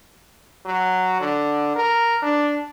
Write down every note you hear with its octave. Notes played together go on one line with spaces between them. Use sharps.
F#3
D3
A#4
D4